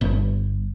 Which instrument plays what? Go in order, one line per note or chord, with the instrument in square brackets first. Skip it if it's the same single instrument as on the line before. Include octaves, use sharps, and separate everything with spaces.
[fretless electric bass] G1